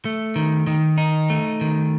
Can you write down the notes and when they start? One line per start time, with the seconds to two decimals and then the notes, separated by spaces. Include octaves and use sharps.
0.05 A3
0.36 D#3
0.67 D#3
0.98 D#4
1.30 A3
1.61 D#3